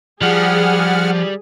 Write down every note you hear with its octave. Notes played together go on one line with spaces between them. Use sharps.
F3 G3 G#4 F#5 F6